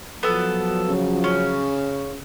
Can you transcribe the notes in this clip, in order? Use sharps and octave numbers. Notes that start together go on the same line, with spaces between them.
F3 F#3 B3 A4
C#3
C#4